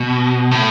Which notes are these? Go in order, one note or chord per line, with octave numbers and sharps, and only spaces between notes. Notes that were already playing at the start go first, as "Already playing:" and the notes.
Already playing: B2
A2